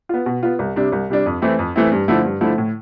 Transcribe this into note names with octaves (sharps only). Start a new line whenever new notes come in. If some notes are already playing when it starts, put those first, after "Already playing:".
B3 F4
B2
B3 F4
C2
C3 G3 D4
C2
C3 G3 D4
F2
E3 A3 C4 E4
F2
E3 A3 C4 E4
G2
D3 F3 A3 E4
G2
D3 F3 A3 E4
A2